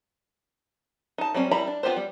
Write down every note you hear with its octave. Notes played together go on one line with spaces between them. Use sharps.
D#4 A5
F#3 G3 C4 C#4
G3 E4 A#5 B5
D4
B3 F4 G4 B4 C5
G3